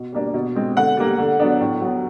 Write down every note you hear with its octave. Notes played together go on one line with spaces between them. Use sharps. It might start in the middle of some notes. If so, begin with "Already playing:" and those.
Already playing: B2
G3 A#3 D4
B2
G#3 C4
D3 F#5
G3 A#3
D3
F#3 B3 D4
A2
F#3 B3